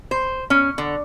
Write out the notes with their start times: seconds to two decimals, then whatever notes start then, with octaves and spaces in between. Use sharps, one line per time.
0.11 C5
0.50 C#4
0.78 D3